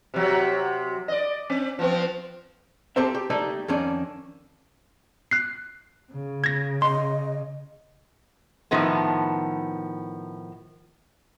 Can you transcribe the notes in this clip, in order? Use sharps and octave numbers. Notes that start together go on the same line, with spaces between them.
C3 F#3
D5 D#5
C4
F3 B3 C4
C4 G4 A4 A#4 C5 E5
G4
G3 A3 A#3 D#4 D5
F2 D#3 C#4 D4
F#6 C7
C#3
G#6 A#6
D#5 C6
A2 D#3 F3 B3